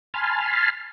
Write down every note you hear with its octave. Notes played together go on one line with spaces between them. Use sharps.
G#5 A5 B5 C6 F6